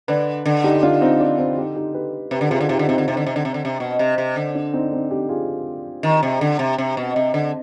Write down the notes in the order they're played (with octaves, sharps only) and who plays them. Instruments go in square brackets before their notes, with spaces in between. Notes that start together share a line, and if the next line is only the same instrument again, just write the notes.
[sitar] D3 [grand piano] B4 D5
[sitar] D3
[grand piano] D#4 G4
D4 F4
C4 D#4
D4
C4 D#4
D#4 G4
D#4 G4
G4 B4
[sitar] C3 [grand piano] G4 B4
[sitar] D3
[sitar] C3 [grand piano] F4 G#4
[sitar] D3
[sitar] C3 [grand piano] D#4 G4
[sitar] D3
[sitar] C3 [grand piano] C4 D#4
[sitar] D3
C3
D3
C3
D3
C3
D3
C3
B2
C3
C3
D3
[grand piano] D4
C4 D#4
C4 D#4
D#4 G4
F4 G#4
[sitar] D#3
C3
D3
C3
C3
B2
C3
D3